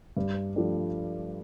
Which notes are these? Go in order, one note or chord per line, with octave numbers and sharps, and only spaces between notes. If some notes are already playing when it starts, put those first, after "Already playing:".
G2
F3 A3 D4 G4